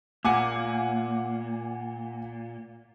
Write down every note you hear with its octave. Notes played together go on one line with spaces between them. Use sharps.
A#2 F#5 G#5 D6